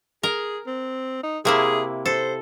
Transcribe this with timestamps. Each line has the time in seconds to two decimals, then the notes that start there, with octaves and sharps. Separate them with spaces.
0.23 G#4 A#4
0.66 C4
1.23 D#4
1.45 C3 A#3 E4 G#4
2.06 A4 C5